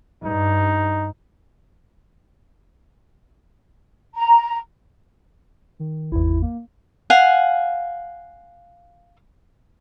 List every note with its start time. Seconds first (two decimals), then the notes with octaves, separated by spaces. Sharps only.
0.24 G2 D#4
4.15 A#5
5.79 D#3
6.12 G#1 E2 E4
6.42 A#3
7.10 F5 F#5 G#5